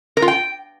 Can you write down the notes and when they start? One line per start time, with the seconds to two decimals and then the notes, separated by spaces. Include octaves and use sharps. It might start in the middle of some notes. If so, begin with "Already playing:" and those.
0.17 A#4
0.22 F4
0.28 G5